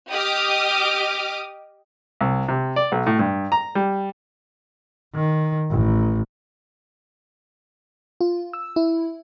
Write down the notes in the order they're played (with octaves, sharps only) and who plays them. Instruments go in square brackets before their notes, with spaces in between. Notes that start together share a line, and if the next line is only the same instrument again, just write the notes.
[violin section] G4 D#5 D6 D#6 F6
[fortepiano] C2
C3
D5
B1
A2
G2
A#5
G3
[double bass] D#3
A1
[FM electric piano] F4
E6
E4